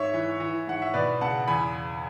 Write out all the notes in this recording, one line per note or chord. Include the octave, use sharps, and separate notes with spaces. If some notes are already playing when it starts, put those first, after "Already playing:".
Already playing: G#2 C#5 E5
E3
E3
G#2 F#5
E5
B2 B4 D5
C#2 F#5 A5
E2 G#5 B5